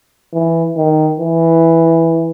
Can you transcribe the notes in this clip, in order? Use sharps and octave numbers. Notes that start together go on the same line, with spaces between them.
E3
D#3
E3